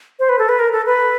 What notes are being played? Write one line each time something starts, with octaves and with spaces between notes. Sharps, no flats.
C5
B4
A4
B4
A#4
A4
B4